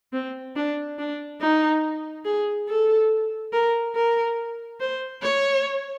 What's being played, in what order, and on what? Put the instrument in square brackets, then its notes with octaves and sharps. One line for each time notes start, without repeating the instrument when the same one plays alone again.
[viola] C4
D4
D4
D#4
G#4
A4
A#4
A#4
C5
C#5